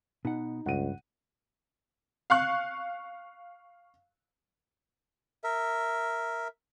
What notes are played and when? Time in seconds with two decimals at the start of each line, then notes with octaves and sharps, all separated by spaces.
0.25 B2 D#4 F#5
0.66 C#2 G2 F#5 D#7
2.30 F5 C#6 F#6
5.44 A#4 E5